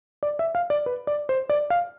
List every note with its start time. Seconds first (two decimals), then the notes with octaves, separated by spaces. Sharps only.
0.23 D5
0.39 E5
0.55 F5
0.70 D5
0.86 B4
1.07 D5
1.29 C5
1.49 D5
1.70 F5